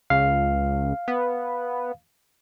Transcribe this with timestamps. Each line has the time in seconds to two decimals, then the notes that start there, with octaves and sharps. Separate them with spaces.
0.10 C#2 F5
1.08 B3